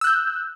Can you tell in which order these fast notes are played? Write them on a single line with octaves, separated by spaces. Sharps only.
E6 F#6 G6